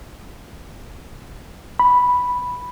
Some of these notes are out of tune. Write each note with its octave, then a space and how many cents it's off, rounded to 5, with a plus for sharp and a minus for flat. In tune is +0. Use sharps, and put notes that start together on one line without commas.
B5 -5